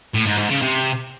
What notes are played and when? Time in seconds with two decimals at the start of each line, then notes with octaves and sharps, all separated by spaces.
0.14 A2
0.26 G#2
0.38 G#2
0.50 C#3
0.62 C3